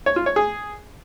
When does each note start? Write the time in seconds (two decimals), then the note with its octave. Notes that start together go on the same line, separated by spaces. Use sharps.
0.06 C#5
0.16 F4
0.26 C#5
0.36 G#4